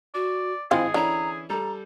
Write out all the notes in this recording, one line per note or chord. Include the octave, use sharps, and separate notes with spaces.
F#4 D5
G#1 F3 C4 E4 F4 G#4 G#5
D3 E3 C#4 E4 A#5
G3 A4 A#5